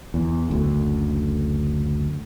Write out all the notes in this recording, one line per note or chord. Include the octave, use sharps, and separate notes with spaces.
E2
F#1 D2 D3